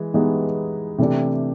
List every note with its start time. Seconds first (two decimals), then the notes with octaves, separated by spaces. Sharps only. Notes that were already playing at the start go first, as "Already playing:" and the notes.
Already playing: E3 G#3
0.14 E3 G#3 B3 D#4 G4
0.98 C3 E3 A3 D4 G4